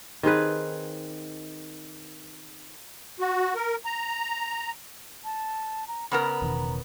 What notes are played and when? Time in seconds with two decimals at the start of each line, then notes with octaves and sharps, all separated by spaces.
0.23 D#3 C4 G#4 B4
3.20 F#4
3.55 A#4
3.85 A#5
5.24 A5
5.88 A#5
6.11 C#3 B3 A#4 A#5
6.42 E1 B2 D#3